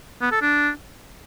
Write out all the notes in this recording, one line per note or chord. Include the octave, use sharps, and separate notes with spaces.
B3
A4
D4